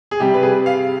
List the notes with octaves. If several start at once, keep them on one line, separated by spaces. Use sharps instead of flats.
G#4
C3 G3 G4
B4
G#4
F5